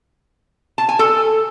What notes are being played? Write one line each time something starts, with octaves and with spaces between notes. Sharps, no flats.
A5
G#5
A4